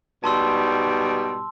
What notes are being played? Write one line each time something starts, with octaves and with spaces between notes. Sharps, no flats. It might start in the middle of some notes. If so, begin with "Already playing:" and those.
G#2 B2 G3 A5 C6 E6